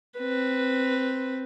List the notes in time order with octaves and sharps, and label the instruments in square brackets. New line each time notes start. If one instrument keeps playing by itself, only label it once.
[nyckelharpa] C4 B4